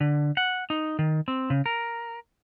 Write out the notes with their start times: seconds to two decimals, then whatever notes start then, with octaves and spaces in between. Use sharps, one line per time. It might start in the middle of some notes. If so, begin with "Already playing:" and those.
0.01 D3
0.37 F#5
0.70 D#4
0.99 D#3
1.28 C4
1.50 C#3
1.66 A#4